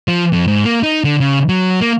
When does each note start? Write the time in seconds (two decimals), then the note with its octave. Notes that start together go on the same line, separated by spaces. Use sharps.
0.08 F3
0.33 F2
0.48 G#2
0.65 A#3
0.83 D#4
1.04 D3
1.20 C#3
1.49 F#3
1.81 A#3